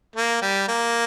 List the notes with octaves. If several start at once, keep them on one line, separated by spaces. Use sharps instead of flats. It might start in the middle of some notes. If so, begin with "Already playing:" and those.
A#3
G3
A#3